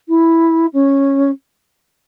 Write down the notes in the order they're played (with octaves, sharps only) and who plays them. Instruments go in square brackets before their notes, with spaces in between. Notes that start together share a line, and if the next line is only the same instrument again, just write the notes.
[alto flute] E4
C#4